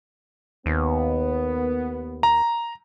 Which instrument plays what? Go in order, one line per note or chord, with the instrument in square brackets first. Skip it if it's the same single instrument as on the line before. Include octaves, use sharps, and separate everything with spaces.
[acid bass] D#2 [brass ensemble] B3
[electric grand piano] A#5